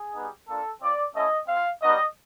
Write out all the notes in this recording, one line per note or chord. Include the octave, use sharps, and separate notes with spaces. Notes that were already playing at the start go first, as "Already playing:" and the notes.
Already playing: G#4
G3 B3 D#4
A#3 D4 F4 A4
C4 F4 D5
A3 C#4 E4 D#5
C4 F4 F5
G3 B3 D#4 F#4 D#5